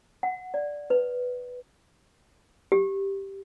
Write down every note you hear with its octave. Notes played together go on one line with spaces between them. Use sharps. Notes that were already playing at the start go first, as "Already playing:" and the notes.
F#5
D5
B4
G4